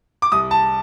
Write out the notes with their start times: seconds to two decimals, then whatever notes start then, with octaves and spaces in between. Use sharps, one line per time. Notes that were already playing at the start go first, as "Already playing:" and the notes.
0.22 D6
0.32 C2 D#6
0.51 A5